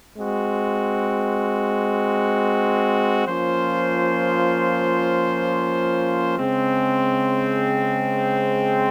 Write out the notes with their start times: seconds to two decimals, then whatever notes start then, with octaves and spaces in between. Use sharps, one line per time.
0.17 G#3 C4 F#4
3.27 F3 A#3 C#4 F4 C5
6.39 C#3 G#3 C4